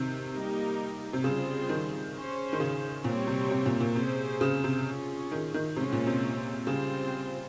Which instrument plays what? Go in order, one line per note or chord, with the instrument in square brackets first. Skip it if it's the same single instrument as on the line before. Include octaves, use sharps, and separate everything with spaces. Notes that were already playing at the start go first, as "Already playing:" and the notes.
Already playing: [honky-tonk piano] C3 D#3
[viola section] G3 A#3 D#4 G4 A#4
[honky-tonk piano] C3
[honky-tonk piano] C#3 [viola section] G3 C4 F4 G#4 C5
[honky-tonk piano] D#3
[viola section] C#4 G#4 C5
[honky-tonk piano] D#3
C#3
[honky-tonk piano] A#2 [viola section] G3 C4 G4 C#5
[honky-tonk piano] C3
C3
A#2
A#2
[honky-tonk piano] C3 [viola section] C#4 G#4 C5
[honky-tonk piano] C#3
C3
[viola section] C#4 F4 G#4
[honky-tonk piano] D#3
D#3
[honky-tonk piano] C3 [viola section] G#3 C#4 F4 C5
[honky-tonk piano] A#2
C3
[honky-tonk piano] C#3 [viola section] G3 C4 F4 C5